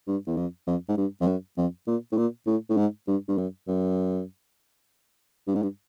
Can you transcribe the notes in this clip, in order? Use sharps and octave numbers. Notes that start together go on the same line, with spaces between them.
G2
E2
F2
F2
G#2
G2
F2
F#2
F2
A#2
A2
A#2
A2
A2
G#2
G2
G2
F#2
F#2
G2
G#2
G2